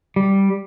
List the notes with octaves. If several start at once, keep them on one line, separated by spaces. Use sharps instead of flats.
G3